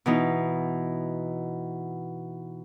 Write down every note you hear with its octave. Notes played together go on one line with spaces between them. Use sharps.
B2 E3 D#4